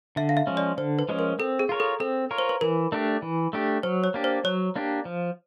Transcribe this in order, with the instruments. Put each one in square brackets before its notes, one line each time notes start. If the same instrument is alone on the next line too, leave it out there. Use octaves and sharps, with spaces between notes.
[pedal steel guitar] D3 [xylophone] E5
[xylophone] F5
E5
[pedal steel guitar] F3 G#3 C#4
[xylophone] D5
[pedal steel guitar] D3 [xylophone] C5
[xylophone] B4
[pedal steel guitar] F3 G#3 C#4
[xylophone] A#4
[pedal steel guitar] C4 [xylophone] A4
[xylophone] G#4
[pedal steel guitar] F4 A#4 C#5
[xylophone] A4
[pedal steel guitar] C4 [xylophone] A4
[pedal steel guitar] F4 A#4 C#5
[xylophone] C5
B4
[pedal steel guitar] E3 [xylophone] A#4
[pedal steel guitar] A3 D4 G4
E3
A3 D4 G4
[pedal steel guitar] F#3 [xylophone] C5
[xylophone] C#5
[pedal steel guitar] A#3 D4 G4
[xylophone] C5
[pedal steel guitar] F#3 [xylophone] C#5
[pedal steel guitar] A#3 D4 G4
F3